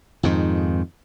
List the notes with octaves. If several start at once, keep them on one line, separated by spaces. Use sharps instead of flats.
F2 G#2 D#3